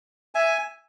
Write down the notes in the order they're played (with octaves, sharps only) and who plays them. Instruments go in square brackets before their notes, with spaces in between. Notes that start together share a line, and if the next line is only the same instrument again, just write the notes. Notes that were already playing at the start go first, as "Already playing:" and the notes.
[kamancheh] E5 [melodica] G#5